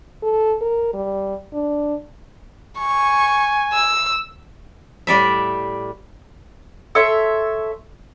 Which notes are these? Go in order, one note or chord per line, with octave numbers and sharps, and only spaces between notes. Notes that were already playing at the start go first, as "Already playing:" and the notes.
A4
A#4
G3
D4
G#5 C#6
E6
A2 G3 D5 E5
A4 C#5 E5 C6